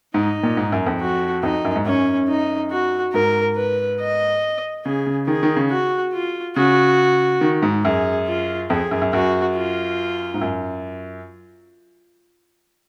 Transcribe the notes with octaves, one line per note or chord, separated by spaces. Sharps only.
G#2 D#4
A#2
G#2
F#2
F2
F#4
F2 D#4
F#2
G#2
F#2 C#4
D#4
F#4
G#2 A#4
B4
D#5
C#3 G#4
C#3
D#3 G#4
D#3
C#3
F#4
F4
C#3 F#4
D#3
G#2
F#2 G#4
F4
F2 G#4
F#2
F#2
F#2 F#4
F4
G#2
F#2